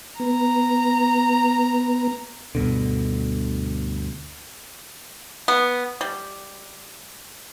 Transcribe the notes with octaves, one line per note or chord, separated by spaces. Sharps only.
B3 A#5
D2 G2 B2 D3
B3
G3